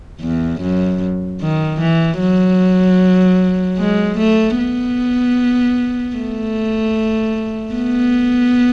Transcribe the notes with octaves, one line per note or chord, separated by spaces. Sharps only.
E2
F#2
D#3
E3
F#3
G#3
A3
B3
A3
B3